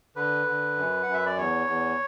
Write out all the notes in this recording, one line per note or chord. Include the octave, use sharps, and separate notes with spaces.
D3 B4
D3
F#2
F#2 F#5
E5
D5
E2 C#5
E2